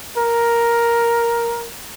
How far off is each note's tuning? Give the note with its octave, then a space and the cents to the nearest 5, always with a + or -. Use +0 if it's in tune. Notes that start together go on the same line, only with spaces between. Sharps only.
A#4 +5